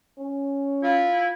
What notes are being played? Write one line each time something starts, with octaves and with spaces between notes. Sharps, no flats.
C#4
E4 F4